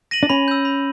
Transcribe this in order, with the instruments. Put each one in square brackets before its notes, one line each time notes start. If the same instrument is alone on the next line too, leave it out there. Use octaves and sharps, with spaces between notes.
[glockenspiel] A#6 D#7 F#7
[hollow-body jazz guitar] D4
[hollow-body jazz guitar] C#4 [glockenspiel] B5
[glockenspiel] E6 G6
B5